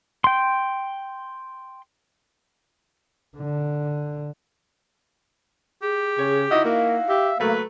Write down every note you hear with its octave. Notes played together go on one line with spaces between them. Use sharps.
G5 C6
D3
G4 G#4
C#3 C#5
D#4 E4 F#4 D#5
A#3 F5
G4 E5
F#3 A3 A#3 B4